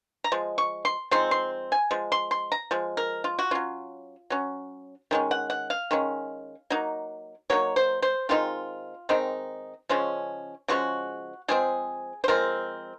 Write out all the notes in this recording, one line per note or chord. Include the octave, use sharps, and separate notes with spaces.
A#5
F3 G#3
C#6
C6
F3 G#3 C4 D#4 C6
C6
G#5
F3 G#3
C6
C6
A#5
F3 G#3
A#4
F4
F#4
F#3 C#4 F4
F#3 C#4
D#3 G#3 C#4
F#5
F#5
F5
D#3 G#3 C#4
F#3 A#3 D#4
F#3 A#3 D#4 C#5
C5
C5
D#3 G#3 C4 D#4 F4
D#3 G#3 C4 D#4
C#3 F3 G#3 C#4
C#3 F3 G#3 C#4 F#4
F3 G#3 C4 G#4
C5
F3 G#3 C4 A#4